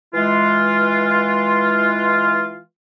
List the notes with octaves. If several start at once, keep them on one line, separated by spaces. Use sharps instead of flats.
E3 G#3 F4